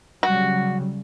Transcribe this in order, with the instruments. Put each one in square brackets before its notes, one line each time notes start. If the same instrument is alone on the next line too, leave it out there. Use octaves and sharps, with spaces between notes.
[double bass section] C#3 F#3 G3 [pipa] F#4